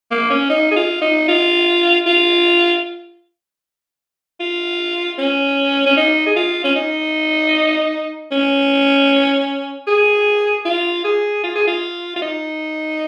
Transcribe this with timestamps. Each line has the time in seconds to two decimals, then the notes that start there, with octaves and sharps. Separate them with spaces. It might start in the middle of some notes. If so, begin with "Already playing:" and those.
0.11 A#3
0.30 C#4
0.50 D#4
0.71 G#4
0.76 F4
1.02 D#4
1.28 F4
2.06 F4
4.41 F4
5.18 C#4
5.86 C#4
5.97 D#4
6.27 G#4
6.36 F4
6.64 C#4
6.76 D#4
8.31 C#4
9.87 G#4
10.65 F4
11.04 G#4
11.44 F4
11.55 G#4
11.68 F4
12.16 F4
12.22 D#4